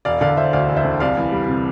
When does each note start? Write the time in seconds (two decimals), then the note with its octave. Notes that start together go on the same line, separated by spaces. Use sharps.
0.05 E1 D5 F5
0.21 D3 D5 F5
0.37 E1 C5 E5
0.53 D2 D5 F5
0.69 E1
0.76 C5 E5
0.85 D3
1.00 C2 D5 F5
1.17 E3
1.32 G3
1.48 C3